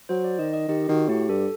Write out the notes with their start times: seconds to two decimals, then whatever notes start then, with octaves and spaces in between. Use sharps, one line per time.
0.09 F#3 C5
0.24 D5
0.39 D#3 D#5
0.54 D#5
0.68 D#3 G4
0.89 D#3 F#4
1.09 A2 G4
1.29 G2 A4